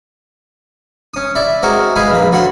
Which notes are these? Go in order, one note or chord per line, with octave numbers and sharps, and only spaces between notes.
C#4 D#6
E4 D5 E5
G#3 C4 F#4 G#4 A#4
G#3 D#4 G#4 B4 F5 G#5
A#1 A#3 B4
D2 F#4 C#5 F#5 B5 C6